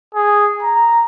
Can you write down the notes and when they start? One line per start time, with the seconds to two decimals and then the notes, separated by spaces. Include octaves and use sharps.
0.15 G#4
0.63 A#5